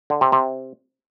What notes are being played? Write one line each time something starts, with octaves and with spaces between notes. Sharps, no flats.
D3
C3
C3